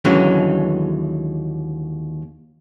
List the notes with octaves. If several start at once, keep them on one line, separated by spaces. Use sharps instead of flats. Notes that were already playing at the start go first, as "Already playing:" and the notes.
D#2 D3 E3 F#3 G#3 C#4